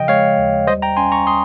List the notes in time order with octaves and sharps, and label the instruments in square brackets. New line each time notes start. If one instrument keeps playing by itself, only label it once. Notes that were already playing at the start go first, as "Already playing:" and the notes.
Already playing: [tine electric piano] C#3 F3 D#5 G5
G#3 C#5 F5
D#2
G3 C5 D#5
G5 A#5
C#4 G#5 C6
A#5 C#6
C6 D#6